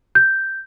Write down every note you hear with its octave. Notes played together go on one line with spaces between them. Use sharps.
G6